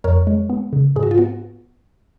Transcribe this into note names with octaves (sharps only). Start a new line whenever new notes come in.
F2 A#4 C#5
G#3
B3
C#3
G#2 G#4
F#4
F4
B3 F#4